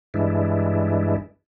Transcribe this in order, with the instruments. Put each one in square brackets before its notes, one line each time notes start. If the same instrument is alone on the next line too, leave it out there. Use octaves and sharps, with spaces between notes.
[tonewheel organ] G2 E3 G#3 D4 E4